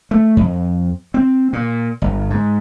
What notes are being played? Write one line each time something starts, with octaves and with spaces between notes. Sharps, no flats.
A3
F2
C4
A#2
G1
G#2